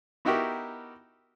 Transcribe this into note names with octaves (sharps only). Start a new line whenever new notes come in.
B3 D#4 E4 F#4 G4 A#4